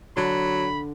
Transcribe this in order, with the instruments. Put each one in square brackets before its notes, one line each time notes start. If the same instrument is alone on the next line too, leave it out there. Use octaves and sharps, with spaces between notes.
[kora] D3 [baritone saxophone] F#3 [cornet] B5